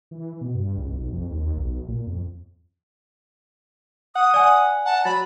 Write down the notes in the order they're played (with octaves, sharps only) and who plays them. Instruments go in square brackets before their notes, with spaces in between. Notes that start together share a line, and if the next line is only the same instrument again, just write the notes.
[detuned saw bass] E3
B2
G2
C#2
B1
F2
D#2
B1
A#2
F2
[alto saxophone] F#5 [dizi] D#6
[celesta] D5 G#5 [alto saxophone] F#5
[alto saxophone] F#5 [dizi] A5
[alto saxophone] F#3 [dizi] B5 [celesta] A6